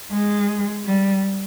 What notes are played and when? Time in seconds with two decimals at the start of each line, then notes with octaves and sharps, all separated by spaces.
0.12 G#3
0.85 G3